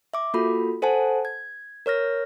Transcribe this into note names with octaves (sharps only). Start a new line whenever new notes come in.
E5 D6
A#3 F4 F#4 A4 B5
A4 C5 F#5 G#5 A5
G#6
A#4 C#5 F6 A#6